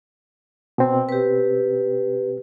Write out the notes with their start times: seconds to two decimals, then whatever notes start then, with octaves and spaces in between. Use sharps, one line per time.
0.78 B2 C4
1.09 G4 B4